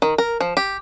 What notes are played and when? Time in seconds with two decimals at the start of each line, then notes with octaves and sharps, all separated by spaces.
0.02 D#3
0.18 A#4
0.41 F3
0.57 G4